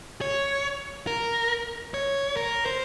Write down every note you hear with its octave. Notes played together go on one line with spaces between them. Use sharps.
C#5
A#4
C#5
A#4
C5